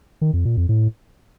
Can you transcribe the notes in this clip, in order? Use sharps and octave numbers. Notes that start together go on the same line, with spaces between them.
D#3
F2
A#2
F2
A2